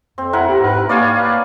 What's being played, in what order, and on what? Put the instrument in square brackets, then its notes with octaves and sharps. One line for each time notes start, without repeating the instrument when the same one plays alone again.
[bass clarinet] F2 [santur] C4
[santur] E4 A#4 F#5
[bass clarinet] G4
[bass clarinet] G#2 [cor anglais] B4
[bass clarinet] A#3 [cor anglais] C#5 [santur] D5 F5 G#5
[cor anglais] B4